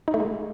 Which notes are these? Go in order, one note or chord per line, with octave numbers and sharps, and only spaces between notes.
D#4
A3
G#3